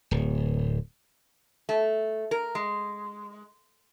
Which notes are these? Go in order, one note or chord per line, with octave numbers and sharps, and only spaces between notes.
D1
A3
A#4
G#3